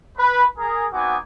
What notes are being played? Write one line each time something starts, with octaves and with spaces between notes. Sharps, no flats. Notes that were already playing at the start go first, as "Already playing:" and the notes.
B4
G#4 A#4
B3 C4 D#4 F#4 G#5 D6